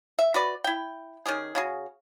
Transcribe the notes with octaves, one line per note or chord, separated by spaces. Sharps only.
E5
F#4 B4 D5
E4 G5
D#3 C#4 G4 G#4
C#3 F#4 G#4